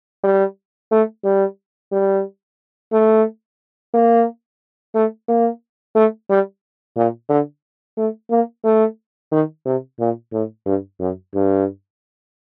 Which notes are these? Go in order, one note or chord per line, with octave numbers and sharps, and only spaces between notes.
G3
A3
G3
G3
A3
A#3
A3
A#3
A3
G3
A#2
D3
A3
A#3
A3
D#3
C3
A#2
A2
G2
F#2
G2